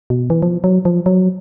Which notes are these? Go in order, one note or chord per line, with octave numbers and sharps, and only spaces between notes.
B2
E3
F3
F#3
F3
F#3